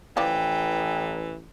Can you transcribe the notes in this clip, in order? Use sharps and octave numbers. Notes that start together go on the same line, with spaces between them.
A1 E3 F3 D5 G5